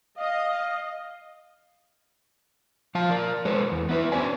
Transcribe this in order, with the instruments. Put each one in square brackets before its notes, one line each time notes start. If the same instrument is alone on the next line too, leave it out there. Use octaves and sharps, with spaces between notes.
[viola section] D#5 [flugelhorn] F5
[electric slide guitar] F3 F5 A5
A#4 D5
G#3 A4 B4 C5
E2
B3 E4 B4
B3 C#4 D4 C5 D5 G#5